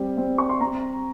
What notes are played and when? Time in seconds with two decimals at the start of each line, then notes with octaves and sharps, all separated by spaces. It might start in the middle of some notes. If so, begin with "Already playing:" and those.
Already playing: G3 C4
0.17 C4
0.38 C#6
0.49 C6
0.60 C4 A#5